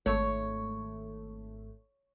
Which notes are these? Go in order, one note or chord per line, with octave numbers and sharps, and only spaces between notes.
G#1 A3 C#5